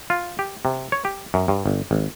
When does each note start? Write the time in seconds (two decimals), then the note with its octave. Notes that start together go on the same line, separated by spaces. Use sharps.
0.10 F4
0.39 G4
0.65 C3
0.92 C#5
1.05 G4
1.34 F#2
1.48 G2
1.66 G1
1.91 G#1